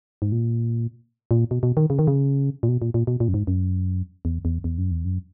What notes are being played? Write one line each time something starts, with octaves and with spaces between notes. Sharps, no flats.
G#2
A#2
A#2
B2
B2
D#3
C#3
D#3
C#3
A#2
B2
A#2
A#2
B2
A#2
F#2
G#2
F#2
E2
E2
E2
F#2
E2
F#2